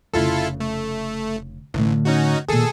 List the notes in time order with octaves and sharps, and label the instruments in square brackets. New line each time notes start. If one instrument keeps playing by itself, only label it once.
[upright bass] F1 C#3 [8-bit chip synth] E4 F4 A4
[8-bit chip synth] A3
[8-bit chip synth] A1 [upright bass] A2 D3
[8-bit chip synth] C#4 D#4 F#4
[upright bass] A#2 D#3 [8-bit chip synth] G#4 A4